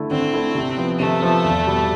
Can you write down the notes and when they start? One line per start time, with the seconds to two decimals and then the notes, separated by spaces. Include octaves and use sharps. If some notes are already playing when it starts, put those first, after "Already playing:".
Already playing: D3 A3 E4
0.11 D3 C4
0.33 A3 E4
0.55 C3
0.78 F3 B3
0.99 C3 A3
1.22 F3 B3
1.44 E2
1.67 B2 G3